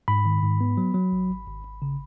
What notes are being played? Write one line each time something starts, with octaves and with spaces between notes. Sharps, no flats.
G#2 B5
D#3
G#2
B3
F#3
F#3
G#1
G#1
G#1
G#1
C#3